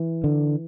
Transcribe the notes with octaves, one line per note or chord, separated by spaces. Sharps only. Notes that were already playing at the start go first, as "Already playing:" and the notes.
Already playing: E3
D3